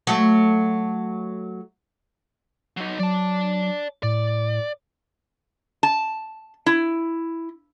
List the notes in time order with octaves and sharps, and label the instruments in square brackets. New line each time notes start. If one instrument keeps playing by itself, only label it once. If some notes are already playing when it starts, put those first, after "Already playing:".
[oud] F#3 A3
[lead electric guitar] F#3 D#4
[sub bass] F#3 [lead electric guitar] D5 A5
[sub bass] A2 [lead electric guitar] D5
[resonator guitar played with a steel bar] A5
E4